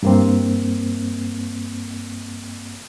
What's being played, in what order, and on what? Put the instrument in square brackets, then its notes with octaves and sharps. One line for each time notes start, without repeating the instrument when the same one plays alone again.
[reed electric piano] G2 A#3 C4